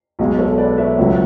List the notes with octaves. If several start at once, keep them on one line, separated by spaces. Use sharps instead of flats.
B1 B2 G#3
A4 C#5
B4 D5
C#5 E5
C#2 C#3 F#3